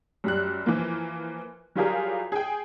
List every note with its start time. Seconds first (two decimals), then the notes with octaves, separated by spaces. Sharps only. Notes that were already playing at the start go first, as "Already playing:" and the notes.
0.24 F#2 G3 F#6
0.66 E3 F3 A#3
1.76 F#3 G3 F4 G4 G#4 A#4
2.32 G#4 G5